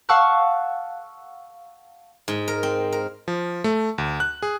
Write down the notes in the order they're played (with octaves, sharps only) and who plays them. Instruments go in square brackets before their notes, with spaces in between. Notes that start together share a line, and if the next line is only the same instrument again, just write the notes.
[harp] F5 F#5 A5 C#6 E6 F#6
[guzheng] G#2
A#4
C4
A#4
[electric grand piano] F3
A3
D2
F#6
G#4